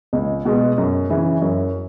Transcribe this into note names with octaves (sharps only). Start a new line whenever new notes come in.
C#2
B2 G#3 B3
F#2
C#3 E3
F#2